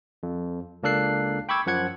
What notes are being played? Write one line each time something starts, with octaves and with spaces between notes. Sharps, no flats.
F2
C#2 A#3 D4 A4 F#6 C7
G5 B5 C#6 D6 E6 G#6
F#2 F3 F#5 G#6 C#7